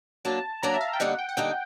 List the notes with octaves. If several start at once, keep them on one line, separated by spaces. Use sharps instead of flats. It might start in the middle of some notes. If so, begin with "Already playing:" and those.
F#3 A#3 D4 A5
F#3 A#3 D4 A#5
E5
F5
G5
D3 G3 A#3 D#4 F#5
G5
F#5
D3 G3 A#3 D#4 G5